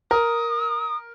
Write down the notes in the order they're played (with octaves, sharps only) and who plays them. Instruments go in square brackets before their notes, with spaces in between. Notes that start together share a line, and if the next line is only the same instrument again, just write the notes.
[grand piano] A#4 [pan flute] D#6